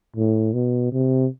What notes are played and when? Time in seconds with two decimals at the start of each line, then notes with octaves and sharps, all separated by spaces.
0.16 A2
0.53 B2
0.92 C3